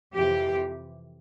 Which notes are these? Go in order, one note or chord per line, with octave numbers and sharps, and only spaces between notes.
F2 C3 E3 G4